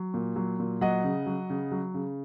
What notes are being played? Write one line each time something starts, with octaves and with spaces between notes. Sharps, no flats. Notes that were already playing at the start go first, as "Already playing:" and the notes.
Already playing: F#3
A#2
F#3
A#2
F#3 D#5 F#5
C#3
F#3
C#3
F#3
C#3